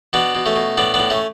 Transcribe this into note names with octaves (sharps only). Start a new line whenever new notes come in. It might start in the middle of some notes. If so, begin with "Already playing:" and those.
B2 B3 D4
B2
A3 C#4
B2
A2 B3 D4
B3 D4
A2
A3 C#4